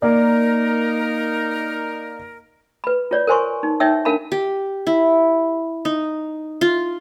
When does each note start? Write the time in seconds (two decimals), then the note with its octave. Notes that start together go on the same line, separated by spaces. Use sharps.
0.02 A#3 D#4 A#4 D5
2.84 B4 B5
3.11 F4 C#5 D5
3.27 A#4 C5 G#5 C6 C#6
3.63 D#4
3.80 D#4 C#5 E5 G5 E6
4.05 D4 A#4 F5 A5 B5
4.32 G4
4.87 E4
5.85 D#4
6.61 F4